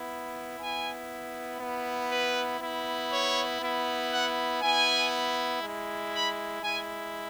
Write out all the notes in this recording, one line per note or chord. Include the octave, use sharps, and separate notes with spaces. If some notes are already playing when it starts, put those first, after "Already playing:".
Already playing: B3 E4
B3 E4 G#5
B3 E4
B4
B3 E4
C#5
B3 E4
F#5
B3 E4 G#5
G#3 E4
B5
G#3 E4 G#5